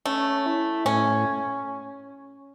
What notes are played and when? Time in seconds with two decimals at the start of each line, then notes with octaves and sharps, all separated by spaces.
0.05 A3 C#4
0.46 E4
0.85 A2 C#4